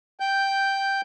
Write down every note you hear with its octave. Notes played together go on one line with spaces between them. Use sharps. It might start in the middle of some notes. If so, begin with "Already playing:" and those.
G5 G6